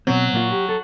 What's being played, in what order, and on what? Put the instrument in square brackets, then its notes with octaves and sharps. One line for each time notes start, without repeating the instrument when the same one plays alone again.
[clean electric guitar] B2 C4 [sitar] F#3
[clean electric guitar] A#2 A#3 F4
G4
A4